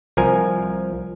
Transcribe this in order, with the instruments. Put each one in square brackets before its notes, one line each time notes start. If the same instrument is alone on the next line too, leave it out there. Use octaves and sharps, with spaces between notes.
[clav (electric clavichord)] C2 F3 A#4 G#5